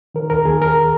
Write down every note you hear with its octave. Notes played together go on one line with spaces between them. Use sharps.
D#3 A#4
D#2 A#4
D#2 G#4
D#2 A#4